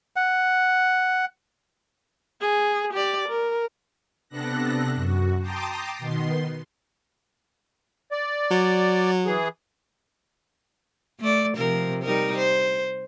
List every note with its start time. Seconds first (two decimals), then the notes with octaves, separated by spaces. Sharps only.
0.16 F#5
2.41 G#4
2.93 G4 D5
3.28 A#4
4.29 C3 B3 D4 A4 F#6 A#6
4.95 F#2 F#4
5.40 G5 A5 A#5 C6 D6 D#6
5.98 B2 D#3 B3 C6
8.12 D5
8.51 F#3
9.26 E3 G#4
11.20 A3 D5
11.57 C3 F3 A#4
12.02 G3 D#4 A#4
12.38 C5